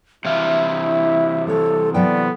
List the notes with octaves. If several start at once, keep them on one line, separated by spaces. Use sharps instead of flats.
C3 E3 E4 E5 F5
G3 A4 C#5
F#3 B3 A4 D5 G5